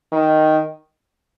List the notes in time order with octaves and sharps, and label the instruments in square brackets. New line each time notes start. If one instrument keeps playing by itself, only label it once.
[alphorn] D#3